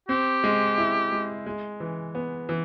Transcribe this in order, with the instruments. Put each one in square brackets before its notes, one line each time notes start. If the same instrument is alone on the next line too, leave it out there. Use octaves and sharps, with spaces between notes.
[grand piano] C4 [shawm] G4
[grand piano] G#3
E4
G#3
G#3
E3
B3
E3